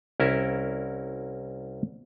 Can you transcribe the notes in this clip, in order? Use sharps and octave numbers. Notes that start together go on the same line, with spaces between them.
C2 C#4 E4 A#4 E5